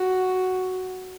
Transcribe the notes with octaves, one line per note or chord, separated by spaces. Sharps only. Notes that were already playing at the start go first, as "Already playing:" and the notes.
Already playing: F#4